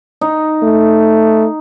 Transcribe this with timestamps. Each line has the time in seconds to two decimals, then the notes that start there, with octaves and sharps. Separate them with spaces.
0.21 D#4
0.63 A3